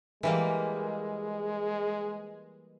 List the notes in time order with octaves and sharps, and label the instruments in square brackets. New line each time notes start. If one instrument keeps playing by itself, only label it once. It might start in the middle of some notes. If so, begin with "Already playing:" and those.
[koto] E3 G3 A#3 [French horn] G#3